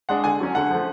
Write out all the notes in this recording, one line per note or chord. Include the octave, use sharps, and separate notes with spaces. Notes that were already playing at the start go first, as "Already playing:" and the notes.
G#3 D4 F#5
D3 G#5
F#3 C#4
D3 F#5
F3 A3